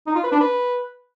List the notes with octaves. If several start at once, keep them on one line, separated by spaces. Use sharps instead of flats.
D#4
F4
B4
D4
B4